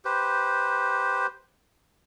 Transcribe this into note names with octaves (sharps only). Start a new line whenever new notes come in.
G4 B4 C5